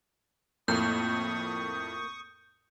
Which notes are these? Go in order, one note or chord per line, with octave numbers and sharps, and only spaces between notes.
F2 A2 A#3 C#6 D#6 G6